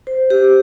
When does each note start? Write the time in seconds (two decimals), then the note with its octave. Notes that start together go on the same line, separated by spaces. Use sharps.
0.07 C5
0.30 G4